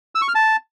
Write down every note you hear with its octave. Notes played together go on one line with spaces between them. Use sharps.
E6
C#6
F6
A5